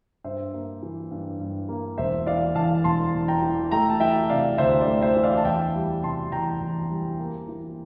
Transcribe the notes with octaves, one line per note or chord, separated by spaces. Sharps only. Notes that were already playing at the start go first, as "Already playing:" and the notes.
G2 C5 E5
A#3
E3
G2
G2
A#3
E1 C5 E5
E3 D5 F5
E2 F5 A5
E1 A5 C6
E1
G5 A#5
E3
A3 G5 A#5
A5
E3 E5 G5
C3 D5 F5
D2 C5 E5
D5
A3
C5 E5
E3
D5 F5
A5
E2 E5 G5
G3
C3 A5 C6
E2 G5 A#5
E2
G3
A#3
E3